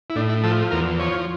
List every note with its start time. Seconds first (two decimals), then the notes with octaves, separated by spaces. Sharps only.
0.10 E4
0.16 A2 D4
0.30 E4
0.44 F3 A4
0.71 E2 A#4
0.99 F3 C#5